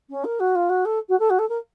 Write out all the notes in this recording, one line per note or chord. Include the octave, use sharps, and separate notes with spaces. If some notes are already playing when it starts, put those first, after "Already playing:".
C#4
A#4
F#4
F4
F#4
A4
F#4
A4
F#4
A4
A#4